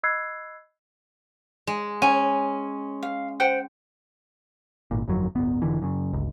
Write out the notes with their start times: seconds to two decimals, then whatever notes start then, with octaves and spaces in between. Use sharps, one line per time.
0.03 D#5 B5 E6 F#6 G#6 C7
1.67 G#3
2.02 C#4 G#5
3.03 F5
3.40 C5 F#5 G5
4.91 G#1 A#2
5.08 G1 F2 F#3
5.35 D1 G1 B3
5.62 F1 D3 E3
5.82 F#2 C#3
6.13 G1 C#2